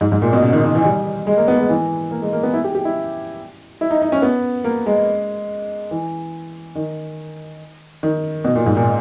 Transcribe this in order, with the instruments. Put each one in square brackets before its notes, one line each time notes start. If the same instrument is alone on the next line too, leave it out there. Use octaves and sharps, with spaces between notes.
[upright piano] G#2
G#2
A#2
B2
C#3
D#3
D#3
E3
G3
G#3
A#3
B3
G#3
E3
A#3
G#3
A#3
B3
E4
G4
G4
E4
E4
D#4
D#4
C#4
B3
A#3
G#3
E3
D#3
D#3
B2
A#2
G#2
A#2